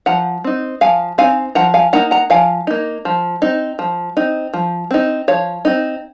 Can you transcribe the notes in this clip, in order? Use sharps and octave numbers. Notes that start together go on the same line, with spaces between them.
F3 F#5 A#5
C4 D#4
F3 F5 G#5
C4 D#4 F5 G#5
F3 F#5 A#5
F5 G#5
A#3 D#4 F#5 A#5
F#5 A#5
F3 F5 G#5
A#3 D#4
F3
C4 D#4
F3
C4 D#4
F3
C4 D#4
F3 C#5 F5
C4 D#4